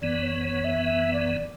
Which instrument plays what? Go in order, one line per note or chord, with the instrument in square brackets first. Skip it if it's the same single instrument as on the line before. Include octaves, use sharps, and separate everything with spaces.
[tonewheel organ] F#2 E3 B3 [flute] D5
[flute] C#5
C#5
E5
E5
D5